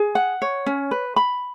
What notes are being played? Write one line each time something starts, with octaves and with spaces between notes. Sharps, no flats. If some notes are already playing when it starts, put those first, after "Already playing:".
Already playing: G#4
F#5
C#5
C#4
B4
B5